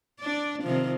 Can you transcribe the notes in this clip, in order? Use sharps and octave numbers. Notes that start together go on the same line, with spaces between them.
D4 D5
C3 D#3 F3